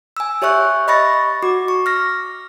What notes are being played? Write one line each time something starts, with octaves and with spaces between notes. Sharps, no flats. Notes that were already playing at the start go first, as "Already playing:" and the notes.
G#5 E6
G4 C#5 E5 C#6 F#6
D#5 B5 C#6 A6 A#6
F#4 D6
C#6
F6 A#6